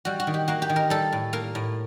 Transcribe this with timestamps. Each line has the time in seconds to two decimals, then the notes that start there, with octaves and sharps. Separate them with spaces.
0.05 G3 F#4
0.20 F#4
0.27 D#3
0.34 G4
0.48 A#3 F#4
0.62 G4
0.70 D#3
0.76 A#4
0.90 G3 A4
1.12 A2
1.33 A#3 A#4
1.55 A2